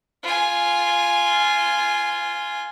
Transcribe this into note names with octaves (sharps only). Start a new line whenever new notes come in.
F4 G#5